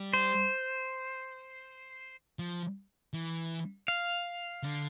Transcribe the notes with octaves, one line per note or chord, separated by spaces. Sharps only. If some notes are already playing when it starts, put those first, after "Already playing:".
Already playing: G3
C5
F3
E3
F5
D3